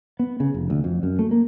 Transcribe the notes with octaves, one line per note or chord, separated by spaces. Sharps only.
B3
C#3
F1
D2
F2
F#2
A3
A#3